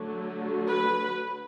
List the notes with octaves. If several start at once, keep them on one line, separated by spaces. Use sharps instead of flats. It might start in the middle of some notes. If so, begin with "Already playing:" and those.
Already playing: D3 F#3 A3
B4